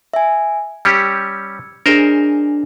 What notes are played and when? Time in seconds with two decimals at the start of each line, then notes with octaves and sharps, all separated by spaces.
0.14 E5 G#5
0.85 G3 C#4 G4 E6 G#6 C#7
1.86 D4 G#4 A#4 C5 D#5